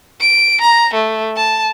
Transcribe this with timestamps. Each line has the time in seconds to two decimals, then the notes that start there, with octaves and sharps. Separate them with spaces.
0.20 D7
0.61 A#5
0.94 A3
1.36 A5